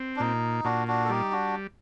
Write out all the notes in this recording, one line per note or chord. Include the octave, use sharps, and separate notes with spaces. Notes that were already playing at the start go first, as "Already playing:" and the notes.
Already playing: C4
D4
A#2 D#4
A#2 D4 F#4
D4 F#4
A4
G3 D#4 G4
D4 F#4